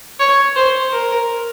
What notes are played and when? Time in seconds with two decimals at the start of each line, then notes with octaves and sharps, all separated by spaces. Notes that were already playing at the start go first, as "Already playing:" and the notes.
0.19 C#5
0.56 C5
0.92 A#4